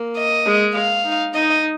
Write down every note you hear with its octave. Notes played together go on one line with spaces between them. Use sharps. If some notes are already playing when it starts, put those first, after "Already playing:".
Already playing: A#3
D#5
G#3
F5
D#4
D#4 D#5